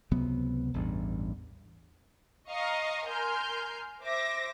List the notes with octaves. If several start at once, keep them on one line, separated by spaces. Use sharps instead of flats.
C#2 C3 F#3 B3
A1 E2 G2
D#5 F5 A#5 C#6 D#6
A#4 G#5 C6 F6 G6
C5 E5 D6 A#6